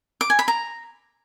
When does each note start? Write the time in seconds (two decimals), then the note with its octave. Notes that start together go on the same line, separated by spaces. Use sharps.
0.21 D6
0.30 G#5
0.39 B5
0.48 A#5